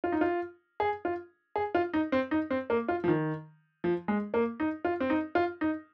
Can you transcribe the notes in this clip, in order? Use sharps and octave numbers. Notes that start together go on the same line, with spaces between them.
F4
D#4
F4
G#4
F4
G#4
F4
D#4
C4
D#4
C4
A#3
F4
F3
D#3
F3
G#3
A#3
D#4
F4
C4
D#4
F4
D#4